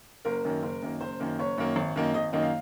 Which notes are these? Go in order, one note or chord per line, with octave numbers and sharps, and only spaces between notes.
F#1 A#4
F#2 D#3 A#3
F#1
F#2 D#3 A#3
F#1 C5
F#2 D#3 A#3
F#1 C#5
F#2 D#3 A#3
G#1
F#2 D#3 A#3 D#4
G#1 D#5
F#2 D#3 A#3 D#4 D#5
F5